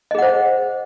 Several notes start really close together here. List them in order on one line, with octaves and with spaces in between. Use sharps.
D#5 G#4 F#5 C5